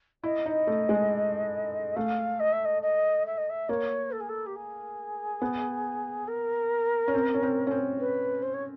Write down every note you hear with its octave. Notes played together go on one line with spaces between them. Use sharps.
E4 D#5
D#4
A3
G#3
A3 F5
D#5
E5
D#5
D#5
E5
D#5
E5
A#3 C#5
A4
G#4
A4
G4
G#4
B3
A#4
C#4
C4
C#4
C4
C#4
C4
B4
C5
C#5